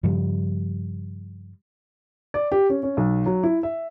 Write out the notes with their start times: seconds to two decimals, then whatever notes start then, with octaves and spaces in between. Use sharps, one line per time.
0.03 G2 C#3 F3 G3
2.34 D5
2.52 G4
2.70 C#4
2.83 C#4
2.97 B1
3.26 F#3
3.43 E4
3.63 E5